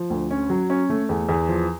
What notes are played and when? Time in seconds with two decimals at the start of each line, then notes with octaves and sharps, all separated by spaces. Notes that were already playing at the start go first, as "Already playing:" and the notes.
Already playing: F3
0.10 D2
0.30 C#4
0.50 F#3
0.70 C#4
0.90 A3
1.09 E2
1.29 E2
1.48 F3